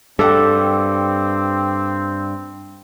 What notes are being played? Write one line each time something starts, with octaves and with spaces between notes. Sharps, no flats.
G2 C4 A4 F#5 G5 D6